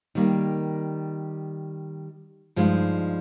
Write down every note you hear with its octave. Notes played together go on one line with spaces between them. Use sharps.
D#3 G3 A#3
G2 F3 G#3 D#4